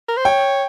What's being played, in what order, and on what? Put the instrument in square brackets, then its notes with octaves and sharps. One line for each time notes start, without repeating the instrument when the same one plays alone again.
[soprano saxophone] A#4
C5
[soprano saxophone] C#5 [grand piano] G5